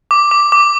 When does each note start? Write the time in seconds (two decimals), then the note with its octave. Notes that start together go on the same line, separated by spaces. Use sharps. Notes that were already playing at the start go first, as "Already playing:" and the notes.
0.11 D6
0.31 D6
0.52 D6